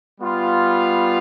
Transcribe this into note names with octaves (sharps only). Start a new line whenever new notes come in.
G3 B3 F4